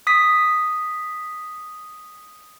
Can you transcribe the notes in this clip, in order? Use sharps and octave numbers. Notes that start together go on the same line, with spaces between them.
D#6 B6